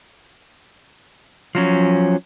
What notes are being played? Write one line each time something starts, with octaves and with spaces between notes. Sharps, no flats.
F3 F#3 C#4